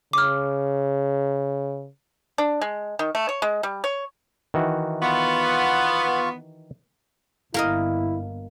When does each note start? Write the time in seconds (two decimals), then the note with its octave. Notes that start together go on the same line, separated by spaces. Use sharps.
0.13 C#3 D6 F6
2.38 D4
2.61 G#3
2.99 D#3
3.15 A3
3.29 C#5
3.42 G#3
3.63 G3
3.84 C#5
4.54 D#3 E3 F#4
5.02 B3 F4 C#6
7.54 G1 A#3 E4 A#4 D#5